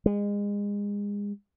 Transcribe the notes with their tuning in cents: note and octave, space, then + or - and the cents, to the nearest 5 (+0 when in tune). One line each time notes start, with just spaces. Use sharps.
G#3 -30